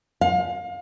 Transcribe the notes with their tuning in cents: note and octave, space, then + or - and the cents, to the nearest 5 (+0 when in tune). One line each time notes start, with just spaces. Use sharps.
F5 +30